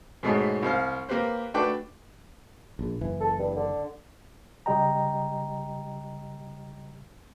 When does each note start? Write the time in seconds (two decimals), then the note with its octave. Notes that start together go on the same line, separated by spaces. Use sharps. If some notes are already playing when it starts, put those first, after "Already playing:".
0.23 G#2 B2 G#3 A3 B3 C#4
0.63 C2 C5 F5
1.09 A#3 G4 B4 C5
1.54 A3 D4 F#4 B4 G5 D6
2.79 A#1
3.01 F#1 E3
3.20 A4
3.39 G2
3.56 D3
4.66 C#3 G3 G4 D#5 G5 A#5